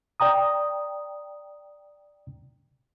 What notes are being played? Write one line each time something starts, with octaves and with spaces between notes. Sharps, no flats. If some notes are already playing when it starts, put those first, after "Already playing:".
D5 G5 A#5 D#6